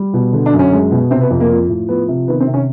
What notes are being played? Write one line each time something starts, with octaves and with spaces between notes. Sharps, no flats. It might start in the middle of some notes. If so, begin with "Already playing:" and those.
Already playing: G3
B2
D3
D4
F#2
C#4
G#3
B2
C3 C4
B3
F2
A#3
F3
A2
F3 B3
C3
D#3 B3
C4
C3
C#4